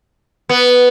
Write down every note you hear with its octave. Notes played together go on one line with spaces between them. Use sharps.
B3